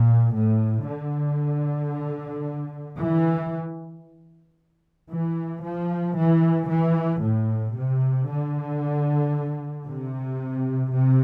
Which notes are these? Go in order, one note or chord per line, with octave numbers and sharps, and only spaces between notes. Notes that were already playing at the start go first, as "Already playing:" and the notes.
Already playing: A#2
A2
D3
E3
E3
F3
E3
E3
A2
C3
D3
C3
C3